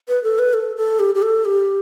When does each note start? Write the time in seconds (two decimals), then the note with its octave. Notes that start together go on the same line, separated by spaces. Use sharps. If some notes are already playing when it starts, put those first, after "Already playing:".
0.08 B4
0.24 A4
0.39 B4
0.54 A4
0.77 A4
0.99 G4
1.15 G4
1.22 A4
1.45 G4